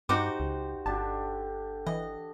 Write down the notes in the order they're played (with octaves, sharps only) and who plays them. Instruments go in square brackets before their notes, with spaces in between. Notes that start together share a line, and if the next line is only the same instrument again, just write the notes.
[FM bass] G2 [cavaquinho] D#4 F#4 C5 [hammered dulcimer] G4 [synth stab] D6
[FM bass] C#2
[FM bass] G1 [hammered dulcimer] D3 D4 G4 [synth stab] A5
[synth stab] E3 [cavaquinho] D#5